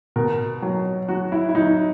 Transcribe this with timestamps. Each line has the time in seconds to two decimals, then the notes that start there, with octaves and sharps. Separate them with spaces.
0.16 B2 A#4
0.62 F#3
1.09 F#3 F#4
1.32 E4
1.49 E4
1.55 F#3 D#4